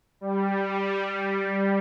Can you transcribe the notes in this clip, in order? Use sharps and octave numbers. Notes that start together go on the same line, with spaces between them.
G3